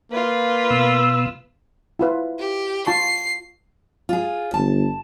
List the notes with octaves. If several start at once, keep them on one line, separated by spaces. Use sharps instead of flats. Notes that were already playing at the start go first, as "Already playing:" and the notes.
A#3 F4 B4
B2 E6
E4 F4 B4
G4
F4 A5 C#6 C7
F4 G#4
G1 A5